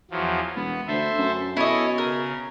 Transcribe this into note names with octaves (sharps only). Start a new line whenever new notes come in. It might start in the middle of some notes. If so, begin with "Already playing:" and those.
E2 F3 F#3
E1 B3
D2 A4 C5 E5
F#2
B2 E4 A4 C#5 D#5 G#5
C#3 A#4